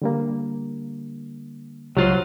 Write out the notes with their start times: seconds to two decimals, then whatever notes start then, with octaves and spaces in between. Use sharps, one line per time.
0.02 D3 G3 A#3
1.97 C#2 F#3 G3 F4 C5